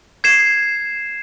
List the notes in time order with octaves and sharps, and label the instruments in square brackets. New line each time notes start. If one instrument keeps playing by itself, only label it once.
[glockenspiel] G#6 C7 E7